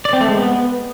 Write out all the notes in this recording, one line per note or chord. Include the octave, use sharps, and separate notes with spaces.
D5
C4
A3
G#3
B3